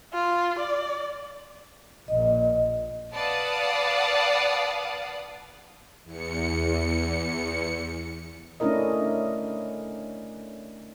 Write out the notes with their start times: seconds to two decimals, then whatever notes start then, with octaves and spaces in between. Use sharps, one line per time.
0.14 F4
0.59 D5
2.08 A#1 A#2 D#5
3.13 B4 D5 F5 F#5 A5 D#6
6.04 E2 C#7
8.60 A3 C#4 D4 E4 A#4 D#5